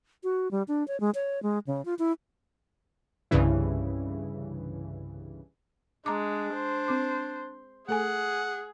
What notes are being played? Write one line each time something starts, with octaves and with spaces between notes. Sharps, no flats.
F#4
G3
D4
C#5
G#3
C#5
G#3
C#3
F4
E4
C2 G2 C#3 E3
G#3 D4 A#5 D6
C5
C4 D6
A3 G#4 A4 F#5 G#5